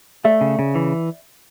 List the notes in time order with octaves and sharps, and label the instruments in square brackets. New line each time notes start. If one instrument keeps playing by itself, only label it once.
[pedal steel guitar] A3 [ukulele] D5 E5
[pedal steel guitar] C#3
C#3
E3